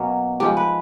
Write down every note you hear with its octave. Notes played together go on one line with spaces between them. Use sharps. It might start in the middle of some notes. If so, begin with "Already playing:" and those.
Already playing: B2 F#3 A#3 C#4
G#2 F3 G#3 G4
B4